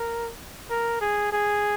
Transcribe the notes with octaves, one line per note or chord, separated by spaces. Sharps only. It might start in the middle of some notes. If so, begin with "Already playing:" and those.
Already playing: A#4
A#4
G#4
G#4